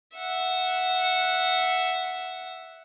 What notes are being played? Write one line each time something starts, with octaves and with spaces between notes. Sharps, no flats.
E5 F#5